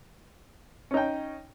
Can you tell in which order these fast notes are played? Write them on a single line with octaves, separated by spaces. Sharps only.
C#4 D#4 G5